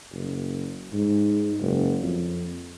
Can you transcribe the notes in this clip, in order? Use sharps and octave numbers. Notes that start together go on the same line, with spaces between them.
F#1
G#2
F#1
F2